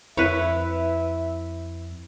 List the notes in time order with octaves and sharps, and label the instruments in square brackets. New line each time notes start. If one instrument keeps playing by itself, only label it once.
[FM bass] F2 [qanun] E4 [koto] B4 C#5 [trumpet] E5